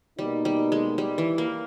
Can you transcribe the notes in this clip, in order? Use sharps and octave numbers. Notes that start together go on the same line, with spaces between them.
B2 G3 A#3 D#4
G3
G#3
G3
E3
A#3